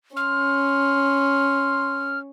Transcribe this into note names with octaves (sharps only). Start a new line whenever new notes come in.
C#4 C6 F6